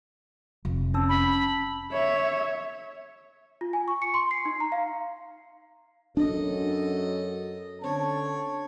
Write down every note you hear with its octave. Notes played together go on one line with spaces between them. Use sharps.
F1
C#4 A5 E6
B5
C#5 E5
F4
G#5
C#6
C#7
C6
C7
D#4
A#5
F5
F#2 D4 A4 D#5
D3 C4 C#4 C#5 A5